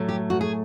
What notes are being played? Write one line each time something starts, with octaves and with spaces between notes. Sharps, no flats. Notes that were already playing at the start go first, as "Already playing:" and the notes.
Already playing: A2 F#3 A3
G4
F#4
G#4